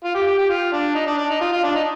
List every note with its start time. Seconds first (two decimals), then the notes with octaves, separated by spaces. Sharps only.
0.04 F4
0.15 G4
0.27 G4
0.38 G4
0.49 F4
0.73 D4
0.95 D#4
1.07 D4
1.18 D4
1.30 D#4
1.41 F4
1.52 F4
1.63 D4
1.75 D#4